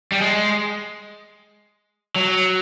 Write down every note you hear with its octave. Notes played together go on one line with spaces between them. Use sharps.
G3
G#3
F#3